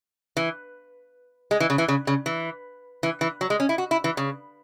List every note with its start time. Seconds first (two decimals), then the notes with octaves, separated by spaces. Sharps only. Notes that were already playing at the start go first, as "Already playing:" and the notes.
0.37 E3
1.51 G#3
1.60 E3
1.70 C#3
1.78 E3
1.88 C#3
2.07 C#3
2.26 E3
3.03 E3
3.21 E3
3.41 F#3
3.50 G#3
3.60 C#4
3.69 E4
3.78 F#4
3.91 E4
4.04 E3
4.17 C#3